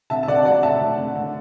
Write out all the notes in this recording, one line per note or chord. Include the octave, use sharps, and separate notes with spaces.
D3 E5 A5
A5
D3 D5 F#5
F#3 D5 F#5
A3 E5 A5
D3
D3
D3